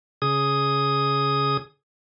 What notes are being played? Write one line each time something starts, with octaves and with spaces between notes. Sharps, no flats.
C#3 G#4 D#6